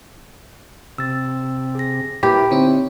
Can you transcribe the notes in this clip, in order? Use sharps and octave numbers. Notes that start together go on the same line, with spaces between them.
C3 E6 A6
G#4 A#6
A#2 E4 G4 A#4 B4 B5
D3 C4 D#4 E4 C#5